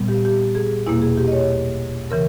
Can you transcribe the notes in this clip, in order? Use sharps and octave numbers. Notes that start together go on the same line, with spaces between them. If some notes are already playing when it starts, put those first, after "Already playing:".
Already playing: A#2 G3 B3
G4
G4
G#4
E2 B2 A#3 E4
G#4
G4
D#5
C#5
C#3 E3 A#4